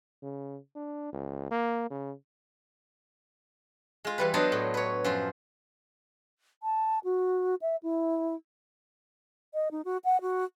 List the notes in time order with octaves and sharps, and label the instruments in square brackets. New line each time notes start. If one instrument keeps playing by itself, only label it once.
[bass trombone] C#3
D4
C#2
A#3
C#3
[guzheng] G#3 F4
E3 G3 B4
F#3 B3 D4 C5 D#5 A5
A2
B4 C#5
F#2 F3 C5
[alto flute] A5
F#4
E5
E4
D#5
D#4
F#4
F#5
F#4